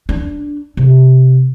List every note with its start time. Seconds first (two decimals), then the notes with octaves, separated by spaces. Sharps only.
0.09 D4
0.77 C3